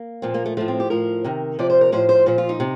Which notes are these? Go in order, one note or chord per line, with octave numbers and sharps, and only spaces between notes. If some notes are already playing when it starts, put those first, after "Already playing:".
Already playing: A#3
A#2 F3 C4
A#3
A3
A2 F3 A3
C4
G4
A2 F3 A#4
C3 D#3
C3 F3 D5
C5
A#4
A2 F3 C5
C5
A#2 F3 C5
F4
D#4
C3